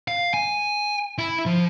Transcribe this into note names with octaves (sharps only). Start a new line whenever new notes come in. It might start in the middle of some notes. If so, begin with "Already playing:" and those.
F5
G#5
E4
F3